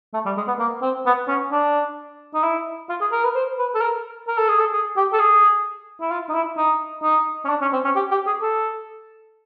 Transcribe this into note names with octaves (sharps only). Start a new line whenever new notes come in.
A3
G3
G#3
B3
A#3
C4
B3
C#4
D4
D#4
E4
F4
G#4
A#4
B4
C5
B4
A4
A#4
A#4
A4
G#4
A4
G#4
G4
A4
G#4
E4
F4
D#4
E4
D#4
D#4
C#4
D4
C#4
C4
C#4
G4
G4
G#4
A4